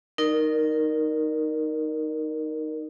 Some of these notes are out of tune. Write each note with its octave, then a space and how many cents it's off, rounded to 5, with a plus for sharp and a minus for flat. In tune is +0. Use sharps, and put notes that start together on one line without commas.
D#4 +0 A#4 +0 D5 +45